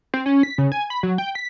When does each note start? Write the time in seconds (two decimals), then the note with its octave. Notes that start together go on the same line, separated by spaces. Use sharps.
0.14 C4
0.26 C#4
0.43 B6
0.58 C#3
0.72 G#5
0.90 B5
1.03 F#3
1.18 G5
1.35 B6